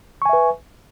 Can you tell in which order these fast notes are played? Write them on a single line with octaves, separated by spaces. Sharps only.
C#6 G#5 E5 B4